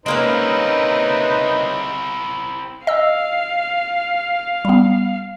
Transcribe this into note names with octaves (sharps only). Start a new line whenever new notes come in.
G#3 A#3 C4 C#4 D#4 E4 B4 C5
D#5 F5 E6
G3 B3